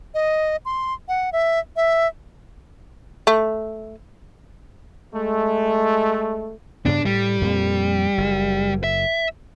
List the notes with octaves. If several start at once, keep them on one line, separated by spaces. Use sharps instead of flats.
D#5
C6
F#5
E5
E5
A3
G#3 A3
G2 C#3 B3 D4
A2 G3
F2 A#2 C4
F#1
E5